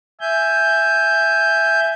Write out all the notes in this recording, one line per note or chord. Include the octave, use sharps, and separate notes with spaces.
E5 G#5 G6